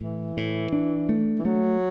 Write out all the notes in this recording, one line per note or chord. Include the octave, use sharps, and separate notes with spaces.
A2 E3
A2
D4
A3
E3
F#3 A3